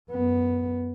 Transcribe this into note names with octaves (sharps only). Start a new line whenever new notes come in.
F#2 B3